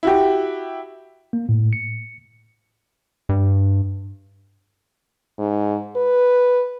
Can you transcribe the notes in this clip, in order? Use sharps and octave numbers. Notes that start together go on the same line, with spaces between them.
E4 F#4 G4
A#3
A2
C#7
G2
G#2
B4